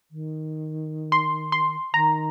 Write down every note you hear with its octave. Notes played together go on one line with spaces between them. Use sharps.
D#3
C6
C6
D#3 A#5